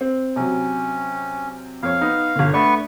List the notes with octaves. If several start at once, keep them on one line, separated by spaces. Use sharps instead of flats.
C4
C3 F#3 C#4
F2 C#5 F5
B3 D#4
G1 D3
A3 B3 D4 B4 C#6